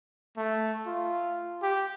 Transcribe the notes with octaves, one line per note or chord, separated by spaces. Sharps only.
A3
F4
G4